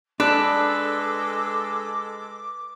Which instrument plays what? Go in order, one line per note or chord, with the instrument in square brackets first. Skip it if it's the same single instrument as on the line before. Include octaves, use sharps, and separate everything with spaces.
[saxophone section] G#3 A4 [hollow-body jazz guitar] D4 [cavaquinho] B4 [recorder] D6